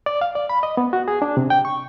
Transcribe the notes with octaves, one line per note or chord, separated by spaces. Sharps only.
D5
F5
D5
B5
D#5
B3
F#4
G#4
D4
C3
G5
C#6